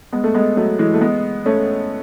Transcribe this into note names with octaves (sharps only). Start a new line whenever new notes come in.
G#3 B3
A3
G#3 B3
F#3 A3
E3 G#3
A3
G#3 B3
A3 C#4